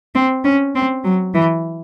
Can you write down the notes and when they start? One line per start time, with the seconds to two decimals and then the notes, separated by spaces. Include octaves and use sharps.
0.15 C4
0.45 C#4
0.75 C4
1.04 F#3
1.34 E3